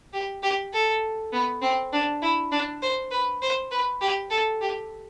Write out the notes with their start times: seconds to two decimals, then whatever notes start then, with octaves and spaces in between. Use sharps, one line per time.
0.13 G4
0.43 G4
0.73 A4
1.33 B3
1.62 C4
1.93 D4
2.22 E4
2.52 D4
2.82 C5
3.11 B4
3.42 C5
3.71 B4
4.01 G4
4.30 A4
4.61 G4